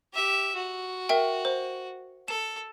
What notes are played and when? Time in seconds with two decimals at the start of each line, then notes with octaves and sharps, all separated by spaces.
0.14 G4 E5
0.55 F#4
1.09 A#4 E5 G5
1.45 C5
2.28 A4 E7